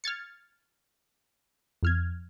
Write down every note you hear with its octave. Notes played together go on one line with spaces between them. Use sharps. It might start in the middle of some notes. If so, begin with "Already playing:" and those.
F6 G#6 A6 C#7
F2 F6 G#6